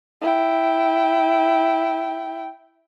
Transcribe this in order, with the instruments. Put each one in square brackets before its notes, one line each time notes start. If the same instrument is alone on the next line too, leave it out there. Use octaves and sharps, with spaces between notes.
[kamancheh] E4 G5